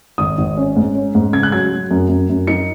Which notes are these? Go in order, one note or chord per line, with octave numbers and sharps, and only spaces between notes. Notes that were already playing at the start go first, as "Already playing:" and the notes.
G#1 D#6
G#1
C#4
G#2
C#4
G#2
C#3 G#6
F#6
F#3 G#6
F#3
F#2
F#2
F#2
D#4 C#7